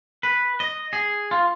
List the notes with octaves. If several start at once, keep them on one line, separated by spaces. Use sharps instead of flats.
B4
D#5
G#4
F4